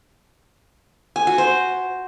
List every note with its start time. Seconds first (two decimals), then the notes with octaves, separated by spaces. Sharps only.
1.16 G#5
1.27 F#4
1.38 C5